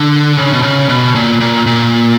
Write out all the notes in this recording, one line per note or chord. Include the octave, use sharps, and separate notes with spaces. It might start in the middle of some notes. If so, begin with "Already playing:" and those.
Already playing: D3
C#3
B2
C#3
B2
A#2
A#2
A#2